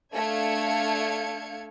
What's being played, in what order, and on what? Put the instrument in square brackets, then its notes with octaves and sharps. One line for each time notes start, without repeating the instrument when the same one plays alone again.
[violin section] A3 D4 F5 G#6 C#7